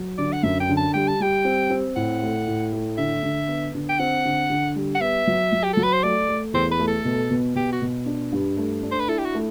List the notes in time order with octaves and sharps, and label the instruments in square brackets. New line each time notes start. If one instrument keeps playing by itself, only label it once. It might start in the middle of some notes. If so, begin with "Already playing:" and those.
Already playing: [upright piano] F#3
[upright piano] D3 [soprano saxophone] D5
[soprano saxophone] F#5
[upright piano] F#2 [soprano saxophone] E5
[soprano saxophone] G5
[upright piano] D3
[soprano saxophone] A5
[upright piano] G3 [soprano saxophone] G5
[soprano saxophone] A5
[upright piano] G3 [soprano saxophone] G5
[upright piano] C4
C4
[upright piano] A2 [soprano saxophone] F#5
[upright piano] A3
A2
A3
[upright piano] D3 [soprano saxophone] E5
[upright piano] D3
B3
D3
[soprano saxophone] G5
[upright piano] C4 [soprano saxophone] F#5
[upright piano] D3
D3
G3
[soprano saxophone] F#5
[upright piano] B3 [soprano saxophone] E5
[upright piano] F#3
F#3
[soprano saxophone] G4
[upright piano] F#3 [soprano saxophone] A4
[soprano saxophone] B4
C5
[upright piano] A3 [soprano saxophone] D5
[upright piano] A3
[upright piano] E2 [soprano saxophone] C5
[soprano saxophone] B4
[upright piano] A3
[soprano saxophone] A4
[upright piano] B2
B2
[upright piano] B2 [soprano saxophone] G4
[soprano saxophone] F#4
[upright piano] B2
D4
G2
A3
D4
[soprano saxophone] C5
B4
[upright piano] E4 [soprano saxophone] A4
[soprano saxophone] G4
F#4
[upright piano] A3